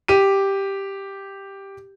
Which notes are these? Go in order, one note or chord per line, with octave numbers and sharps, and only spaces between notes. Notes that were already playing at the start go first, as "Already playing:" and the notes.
G4 D#7